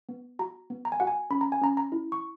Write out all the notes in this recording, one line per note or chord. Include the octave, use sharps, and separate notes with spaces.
B3
F#4 A#5
B3
A#5
G#5
F#4 F#5
G#5
C#4 B5
A#5
G#5
C#4 A#5
A#5
E4
C#6